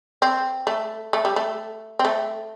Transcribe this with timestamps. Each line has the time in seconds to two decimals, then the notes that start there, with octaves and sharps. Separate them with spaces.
0.22 C4
0.67 A3
1.13 A3
1.25 G3
1.36 A3
1.99 C4
2.05 A3